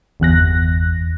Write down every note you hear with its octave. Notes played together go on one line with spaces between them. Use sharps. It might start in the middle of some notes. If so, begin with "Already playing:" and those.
G1 E2 F#6 A#6